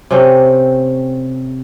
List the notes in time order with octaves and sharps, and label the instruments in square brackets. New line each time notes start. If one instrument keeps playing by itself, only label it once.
[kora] C3 A3 C#4 G4